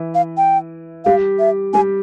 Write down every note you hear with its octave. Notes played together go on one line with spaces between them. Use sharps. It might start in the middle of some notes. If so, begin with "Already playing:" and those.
Already playing: E3 E4
F5
G5
G3 G4 F5
E5
G3 G4 G#5